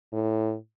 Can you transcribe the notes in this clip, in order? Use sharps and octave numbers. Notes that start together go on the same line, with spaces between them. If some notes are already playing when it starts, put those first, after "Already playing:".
A2